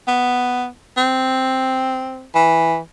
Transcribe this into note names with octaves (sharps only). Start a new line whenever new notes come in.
B3
C4
E3